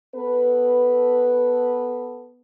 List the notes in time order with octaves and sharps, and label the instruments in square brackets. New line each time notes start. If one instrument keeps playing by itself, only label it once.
[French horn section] B3 A4 B4